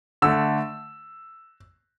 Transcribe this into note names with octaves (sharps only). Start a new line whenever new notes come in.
D3 A3 E6